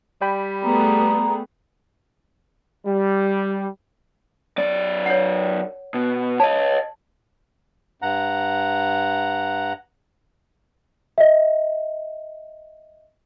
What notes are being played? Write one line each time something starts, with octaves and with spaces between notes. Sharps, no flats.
G3 D5 G5 B5
A3 B3 G#4 A#5
G3
F#2 D5
C#5 F#5
B2
C#5 D#5 A5
G2 F#5 A#5
D#5 E5